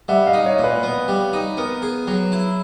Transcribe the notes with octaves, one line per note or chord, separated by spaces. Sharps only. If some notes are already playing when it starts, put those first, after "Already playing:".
G3 E5 F#5
D#5 F5
D#4
C#5 D#5
A#2
B4
B3
G3
D#4
B3 A#4
G#4
F#3
E4